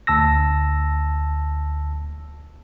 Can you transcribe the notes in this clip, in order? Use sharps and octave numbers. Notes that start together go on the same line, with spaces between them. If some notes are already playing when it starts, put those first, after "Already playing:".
D2 A5 E6 A#6